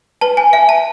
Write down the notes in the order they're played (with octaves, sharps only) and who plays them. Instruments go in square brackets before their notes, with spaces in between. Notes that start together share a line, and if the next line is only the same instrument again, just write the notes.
[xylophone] B4 A5
G#5
E5 G#5
A5